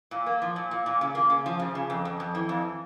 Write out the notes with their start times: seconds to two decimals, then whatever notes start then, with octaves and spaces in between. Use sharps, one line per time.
0.11 A#2
0.26 A#3
0.42 F3
0.56 A#2
0.71 A#2
0.86 A#2
1.01 C#3
1.15 A#3
1.30 C#3
1.46 F3
1.59 C#3
1.75 C#3
1.90 F2
2.05 F2
2.20 F2
2.35 E3
2.49 F2